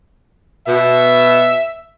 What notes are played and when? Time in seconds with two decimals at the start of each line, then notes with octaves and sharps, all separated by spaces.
0.67 B2 E5